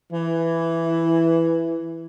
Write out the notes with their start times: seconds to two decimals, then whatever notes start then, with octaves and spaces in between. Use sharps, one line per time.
0.12 E3